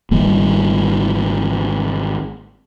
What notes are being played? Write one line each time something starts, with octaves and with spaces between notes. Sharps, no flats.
G#1 G3 A#3